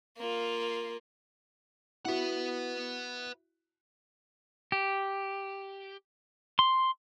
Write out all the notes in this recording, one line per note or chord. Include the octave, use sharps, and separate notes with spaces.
A#3 F4
E4 F#4 B4 F#5
G4
C6